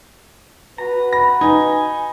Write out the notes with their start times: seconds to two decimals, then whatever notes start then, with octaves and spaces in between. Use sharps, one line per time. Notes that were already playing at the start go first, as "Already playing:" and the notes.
0.78 F#4 B4 A#5
1.13 B5 A#6
1.41 D#4 G#5